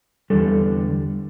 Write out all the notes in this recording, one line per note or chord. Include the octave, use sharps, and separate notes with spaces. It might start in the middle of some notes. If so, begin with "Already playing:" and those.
E2 D3 G3 A4